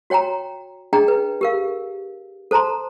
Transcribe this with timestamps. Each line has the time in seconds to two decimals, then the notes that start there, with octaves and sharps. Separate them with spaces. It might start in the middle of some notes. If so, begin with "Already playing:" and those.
0.10 F#4 C#5 G5 G#5 A#5
0.93 D4 G#4 D#5 G5 G#5 A#5
1.08 B4
1.41 G4 A#4 F5
2.51 A4 C5 A5 A#5 C6